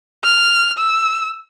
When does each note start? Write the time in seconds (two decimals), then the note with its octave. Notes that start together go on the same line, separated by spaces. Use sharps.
0.24 F6
0.78 E6